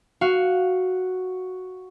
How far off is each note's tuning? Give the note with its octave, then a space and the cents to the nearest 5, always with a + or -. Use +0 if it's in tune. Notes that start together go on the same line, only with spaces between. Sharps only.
F#4 +0 F5 +0